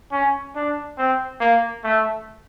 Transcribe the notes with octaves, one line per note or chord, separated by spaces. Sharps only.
C#4
D4
C4
A#3
A3